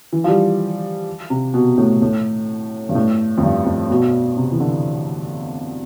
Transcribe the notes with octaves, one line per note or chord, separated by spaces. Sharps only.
E3
F3
G3
C3
B2
A2
A2
G2
A2
F2
G2
F2
B2
C3
E3
D3